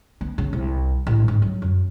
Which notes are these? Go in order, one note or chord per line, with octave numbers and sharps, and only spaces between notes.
B3
C#3
C2
A1
G#2
F#3
F#2